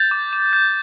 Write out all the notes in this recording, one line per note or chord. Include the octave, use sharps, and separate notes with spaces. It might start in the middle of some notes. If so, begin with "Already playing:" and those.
Already playing: G6 A6
D6
D6
G6